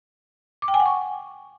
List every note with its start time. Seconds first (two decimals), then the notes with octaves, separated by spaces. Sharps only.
0.62 D6
0.68 G5
0.74 G#5
0.80 F#5
0.86 C#6